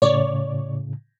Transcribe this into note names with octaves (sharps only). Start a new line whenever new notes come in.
A2 C#3 C#5 D5